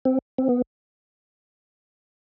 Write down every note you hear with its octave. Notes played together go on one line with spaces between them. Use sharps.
C4
C4
B3